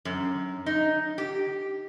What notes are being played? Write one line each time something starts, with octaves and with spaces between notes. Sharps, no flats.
F#2
D#4
G4